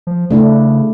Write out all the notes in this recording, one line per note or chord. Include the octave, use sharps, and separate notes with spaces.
F3
C#3 A3 D4 E4